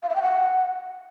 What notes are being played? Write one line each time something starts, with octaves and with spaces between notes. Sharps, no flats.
F5
E5
G5
F#5